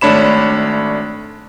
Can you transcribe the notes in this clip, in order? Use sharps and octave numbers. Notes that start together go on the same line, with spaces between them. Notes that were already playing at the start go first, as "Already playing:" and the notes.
G#1 A3 D4 C#5 B5 E7